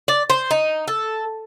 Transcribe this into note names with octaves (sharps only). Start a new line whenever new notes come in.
D5
C5
D#4
A4